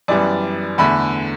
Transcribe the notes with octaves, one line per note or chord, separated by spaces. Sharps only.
F#2 E3 G3 B3 D5
E2 D3 A3 B5